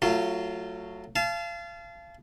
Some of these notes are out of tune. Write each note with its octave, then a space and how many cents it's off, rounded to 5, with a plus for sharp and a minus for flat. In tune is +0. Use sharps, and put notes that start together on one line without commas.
F#3 +0 A3 +20 F4 -15
F5 -30 A5 -30